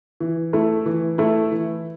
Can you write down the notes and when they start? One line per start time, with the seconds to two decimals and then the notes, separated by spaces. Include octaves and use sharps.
0.20 E3
0.53 A3 E4
0.86 E3
1.18 A3 E4
1.52 E3